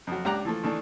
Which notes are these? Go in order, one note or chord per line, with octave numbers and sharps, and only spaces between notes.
F2 F#3
C#2 D4 G4 A#5 F#6
E3 F3 A3
D#3 E3 A3 D4